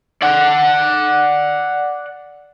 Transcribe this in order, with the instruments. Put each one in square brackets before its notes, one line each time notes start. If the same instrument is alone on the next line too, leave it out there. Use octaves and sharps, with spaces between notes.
[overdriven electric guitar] D5 F#5